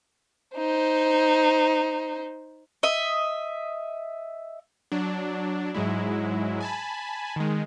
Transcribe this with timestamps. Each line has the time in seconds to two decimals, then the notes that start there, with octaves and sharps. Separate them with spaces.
0.57 D#4 C5
2.83 D#5 E5
4.92 F#3 D4
5.74 G#2 F#3 G#3 E4
6.61 G#5 A5 B5
7.36 D#3 G#3